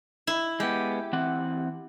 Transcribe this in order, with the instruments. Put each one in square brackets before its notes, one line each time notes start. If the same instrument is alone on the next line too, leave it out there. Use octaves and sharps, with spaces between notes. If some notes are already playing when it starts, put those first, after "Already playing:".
[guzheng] E4
[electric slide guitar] G#3 B3 [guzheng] G4
[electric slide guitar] E3 C4 F#5